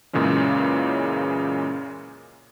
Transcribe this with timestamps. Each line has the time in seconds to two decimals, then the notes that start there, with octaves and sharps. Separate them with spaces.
0.13 F#2 A#2 C#3 E3 G#3 C#4